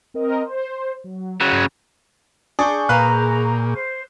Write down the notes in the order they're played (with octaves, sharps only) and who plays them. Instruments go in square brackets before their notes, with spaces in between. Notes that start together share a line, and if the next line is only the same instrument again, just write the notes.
[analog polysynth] C4 A#4 D#5
C5
F#3
[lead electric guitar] C#3 F#3
[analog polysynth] G2
[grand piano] D4 [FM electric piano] G#4 C#6 G6
[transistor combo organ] A#2 [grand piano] B4 F5 F#6 [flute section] A#5
[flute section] C5